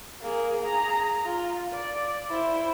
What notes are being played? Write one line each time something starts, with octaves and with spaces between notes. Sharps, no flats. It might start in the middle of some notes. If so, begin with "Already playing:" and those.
A#3 G#4
G#4 A#5
F4
D5
E4 C5